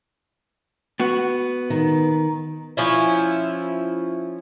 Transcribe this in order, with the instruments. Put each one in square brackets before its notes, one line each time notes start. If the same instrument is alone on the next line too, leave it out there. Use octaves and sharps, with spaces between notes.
[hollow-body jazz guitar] B3 F#4
[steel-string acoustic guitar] D#3
[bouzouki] F3 C#4 E4